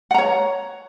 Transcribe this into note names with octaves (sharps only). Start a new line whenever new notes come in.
C#5 F#5 A#5